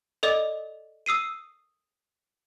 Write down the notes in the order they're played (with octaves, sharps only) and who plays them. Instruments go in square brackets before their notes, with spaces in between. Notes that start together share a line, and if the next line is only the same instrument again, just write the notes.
[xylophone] A4 D5 D#5 D6
D#6 E6 C7 D#7